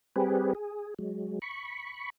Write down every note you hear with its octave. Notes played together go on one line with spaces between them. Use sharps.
G3 C4 G4 G#4 B4
G#4
F#3 G#3
B5 C#6